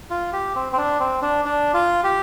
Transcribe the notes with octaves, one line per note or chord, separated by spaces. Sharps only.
F4
G4
C4
C4
D4
C4
D4
D4
F4
G4